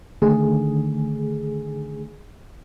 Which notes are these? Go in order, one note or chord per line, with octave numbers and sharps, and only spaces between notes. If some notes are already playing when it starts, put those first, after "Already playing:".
D3 D#3 A3 G#4